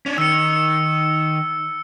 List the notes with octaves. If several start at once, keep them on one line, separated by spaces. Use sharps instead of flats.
C#4 D4
D#3 E6 C#7